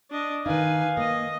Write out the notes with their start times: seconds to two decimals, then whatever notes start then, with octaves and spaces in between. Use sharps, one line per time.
0.11 D4 D#5
0.46 D#3 D#4 B4 F5 G#5
0.97 A#3 D#5